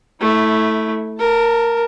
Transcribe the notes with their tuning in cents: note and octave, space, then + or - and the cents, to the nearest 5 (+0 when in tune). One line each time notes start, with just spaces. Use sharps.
A3 +0 E4 -20
A#4 +0 A5 +30